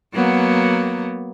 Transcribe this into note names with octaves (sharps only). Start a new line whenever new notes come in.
F#3 A#3 B3